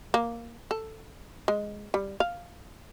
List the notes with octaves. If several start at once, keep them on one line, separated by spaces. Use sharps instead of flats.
A#3
A4
G#3
G3
F5